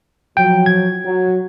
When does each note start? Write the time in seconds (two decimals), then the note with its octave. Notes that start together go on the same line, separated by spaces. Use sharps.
0.37 F3 F#3 G5
0.66 G#6
1.05 F#3